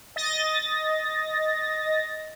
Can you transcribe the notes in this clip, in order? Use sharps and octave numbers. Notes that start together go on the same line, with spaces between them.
D#5 A6 A#6